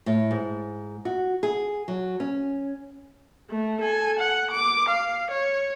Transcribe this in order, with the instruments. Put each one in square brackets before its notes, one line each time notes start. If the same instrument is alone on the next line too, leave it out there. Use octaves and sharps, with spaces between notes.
[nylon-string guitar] A2
G#2
F#4
G#4
F#3
C#4
[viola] A3
A4 G#5
F#5
D6
F5
C#5